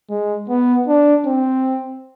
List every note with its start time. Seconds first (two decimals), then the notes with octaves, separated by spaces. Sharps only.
0.10 G#3
0.48 B3
0.88 D4
1.26 C4